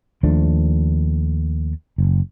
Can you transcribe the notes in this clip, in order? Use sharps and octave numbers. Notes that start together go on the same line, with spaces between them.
D#2 F3 A3 D4
F#1